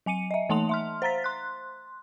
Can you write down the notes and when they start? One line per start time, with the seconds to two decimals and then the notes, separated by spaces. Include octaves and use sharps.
0.06 F#3 G#5 C#7 D#7
0.31 D#5 E5
0.49 E3 A3 D#4 A5 C6 F7
0.69 E5 C6 F6
1.02 C5 F5 A#5 A6 B6
1.24 C6 F#6